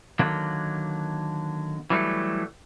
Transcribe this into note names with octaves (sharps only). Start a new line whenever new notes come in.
D3 D#3 F#3 A#3
E3 F#3 G3 A3